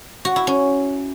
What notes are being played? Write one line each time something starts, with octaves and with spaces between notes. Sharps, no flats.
F#4
E4
C#4